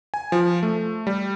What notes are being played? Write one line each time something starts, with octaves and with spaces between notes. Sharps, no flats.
G#5
F3
A3
G3